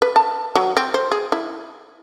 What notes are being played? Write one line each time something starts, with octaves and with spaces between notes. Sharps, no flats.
B4
A5
F#3
C4
C5
G#4
E4